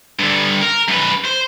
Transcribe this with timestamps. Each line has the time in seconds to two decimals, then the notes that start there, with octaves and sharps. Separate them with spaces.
0.19 G2 D3
0.61 A#4
0.89 F#2 B4
1.25 C5